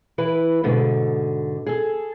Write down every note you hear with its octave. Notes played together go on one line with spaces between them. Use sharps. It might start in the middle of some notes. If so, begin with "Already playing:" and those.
E3 E4 B4
G#2 B2 D3
G#4 A4